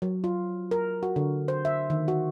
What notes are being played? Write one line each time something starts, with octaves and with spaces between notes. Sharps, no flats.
F#3
F4
A#4
F#4
D3
C5
E5
D#3
F#4